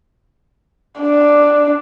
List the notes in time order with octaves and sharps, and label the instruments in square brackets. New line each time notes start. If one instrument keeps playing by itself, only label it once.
[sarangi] D4